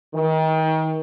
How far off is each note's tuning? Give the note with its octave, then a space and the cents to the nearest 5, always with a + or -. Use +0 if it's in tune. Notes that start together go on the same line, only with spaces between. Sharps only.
D#3 +30